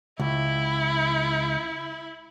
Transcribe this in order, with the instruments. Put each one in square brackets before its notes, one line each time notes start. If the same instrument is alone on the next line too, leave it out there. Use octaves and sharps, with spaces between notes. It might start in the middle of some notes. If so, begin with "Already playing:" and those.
[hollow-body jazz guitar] C#2 [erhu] E4